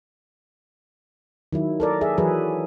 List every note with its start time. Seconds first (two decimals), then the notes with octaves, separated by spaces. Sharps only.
1.53 D#3 F#3 E4
1.80 A4 A#4 D5
2.01 G#4 E5
2.18 E3 F#3 G#4 B4